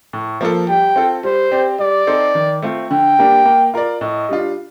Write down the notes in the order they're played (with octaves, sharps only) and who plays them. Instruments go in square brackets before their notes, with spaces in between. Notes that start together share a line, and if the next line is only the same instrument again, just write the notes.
[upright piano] A2
F3 A#3 F4 A4
[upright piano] G3 [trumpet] G5
[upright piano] C4 F4 A4
[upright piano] G3 [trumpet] C5
[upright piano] C4 G4 D5
[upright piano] G3 [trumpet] D5
[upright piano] C4 D#4 A4 C5
D#3
A3 C4 F4
[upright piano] D3 [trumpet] G5
[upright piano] G3 A#3 D4
A#3
F4 A#4 D5
[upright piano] A2 [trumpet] D#5
[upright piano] G3 D4 F4